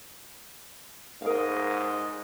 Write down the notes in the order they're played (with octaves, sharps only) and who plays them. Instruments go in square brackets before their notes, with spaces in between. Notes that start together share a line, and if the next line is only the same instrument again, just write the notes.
[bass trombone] G#2 [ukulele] A#4 F5 [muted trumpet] D#5